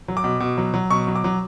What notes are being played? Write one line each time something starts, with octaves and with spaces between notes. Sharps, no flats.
F#3
D6
B2
B2
F#3
F#3
B2 C#6
F#3
D6
F#3